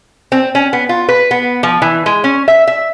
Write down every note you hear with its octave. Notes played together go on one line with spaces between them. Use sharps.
C4
C#4
B3
F4
B4
B3
F3
E3
G#3
C#4
E5
E5